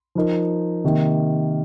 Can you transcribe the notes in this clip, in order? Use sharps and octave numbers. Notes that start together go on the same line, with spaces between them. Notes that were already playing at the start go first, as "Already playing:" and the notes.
F3 D#4 A#4
C3 D#3 A#3